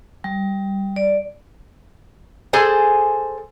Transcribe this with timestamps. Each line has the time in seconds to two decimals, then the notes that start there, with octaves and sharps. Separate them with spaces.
0.24 G3
0.96 D5
2.53 G#4 A4 C5 G#5